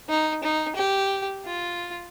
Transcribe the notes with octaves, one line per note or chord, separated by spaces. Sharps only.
D#4
D#4
G4
F4